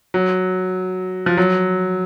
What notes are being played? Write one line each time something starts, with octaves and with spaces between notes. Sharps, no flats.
F#3
F3
F#3